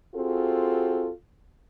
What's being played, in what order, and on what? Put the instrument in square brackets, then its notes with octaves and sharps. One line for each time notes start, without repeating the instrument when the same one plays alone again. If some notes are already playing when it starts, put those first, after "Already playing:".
[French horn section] C4 F4 F#4 G#4 A4